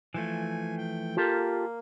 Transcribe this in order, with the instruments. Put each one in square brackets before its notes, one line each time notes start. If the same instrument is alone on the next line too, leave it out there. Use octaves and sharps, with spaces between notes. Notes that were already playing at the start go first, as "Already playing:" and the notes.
[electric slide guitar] E3 F3 A3 [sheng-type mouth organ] G#5
[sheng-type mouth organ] G5
[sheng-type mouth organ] A#3 [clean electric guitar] F4 G4 A4